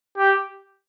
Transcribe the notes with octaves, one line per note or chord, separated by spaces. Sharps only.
G4